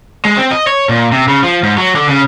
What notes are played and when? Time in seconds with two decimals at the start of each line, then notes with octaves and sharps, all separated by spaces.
0.25 G#3
0.37 C4
0.51 D#5
0.67 C#5
0.89 A#2
1.12 C3
1.28 C#3
1.43 F3
1.63 G#2
1.78 F#3
1.96 D3
2.09 C#3